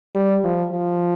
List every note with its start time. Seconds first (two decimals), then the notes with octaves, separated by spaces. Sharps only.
0.15 G3
0.44 F3
0.73 F3